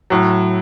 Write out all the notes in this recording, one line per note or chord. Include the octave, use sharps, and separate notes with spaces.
A2 F#3